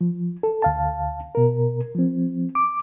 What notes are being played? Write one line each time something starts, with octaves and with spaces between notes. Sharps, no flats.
F3
A4
D2 F5 A5
B2 A#4
F3 C4
D6